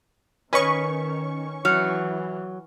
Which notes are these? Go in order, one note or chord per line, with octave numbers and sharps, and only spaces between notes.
D#3 C#4 B4 D#5 C#6
E3 F#3 F6 C#7